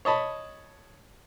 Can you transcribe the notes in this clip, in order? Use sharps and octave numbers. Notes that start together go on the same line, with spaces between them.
C#5 D#5 A5 B5